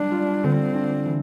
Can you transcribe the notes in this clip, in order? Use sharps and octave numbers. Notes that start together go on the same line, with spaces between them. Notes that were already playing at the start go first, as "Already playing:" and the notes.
Already playing: G3 D4
F4
D3 C4
D4
E3